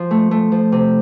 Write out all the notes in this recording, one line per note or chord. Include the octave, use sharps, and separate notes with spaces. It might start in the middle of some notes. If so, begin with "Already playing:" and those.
Already playing: F3
A3
A3
F3
C3